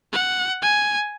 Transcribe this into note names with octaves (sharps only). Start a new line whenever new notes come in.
F#5
G#5